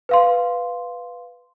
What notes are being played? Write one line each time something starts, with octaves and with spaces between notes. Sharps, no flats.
B4 F5 C6